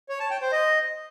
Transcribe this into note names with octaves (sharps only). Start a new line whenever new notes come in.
C#5
A5
G5
C5
D#5